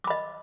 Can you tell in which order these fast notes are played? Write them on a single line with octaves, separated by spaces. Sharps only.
D6 B5 D#5